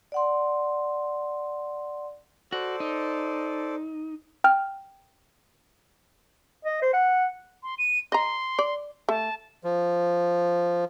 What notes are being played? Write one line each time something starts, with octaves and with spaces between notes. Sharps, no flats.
D5 F#5 C6
F#4 A4 C5 D5
D#4
G5 F6
D#5
C5
F#5
C6
D#7
D#5 A#5 C6
D5
A3 A5
F3